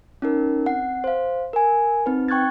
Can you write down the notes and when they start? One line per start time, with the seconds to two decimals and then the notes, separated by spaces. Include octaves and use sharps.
0.22 C#4 D#4 A#4
0.66 C4 F#5 C7
1.04 C5 F5
1.53 A#4 G#5
2.06 C4 D#4 B4
2.28 G5 C#6 F#6 G#6 A6